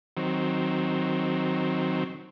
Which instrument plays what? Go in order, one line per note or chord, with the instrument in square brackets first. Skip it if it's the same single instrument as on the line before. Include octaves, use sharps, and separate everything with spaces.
[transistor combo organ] D#3 F#3 C4